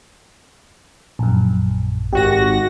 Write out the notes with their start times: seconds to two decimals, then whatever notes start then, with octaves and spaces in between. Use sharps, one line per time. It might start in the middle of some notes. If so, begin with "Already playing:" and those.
1.19 A#1 F#2
2.13 G#1 F#4 G4 A#6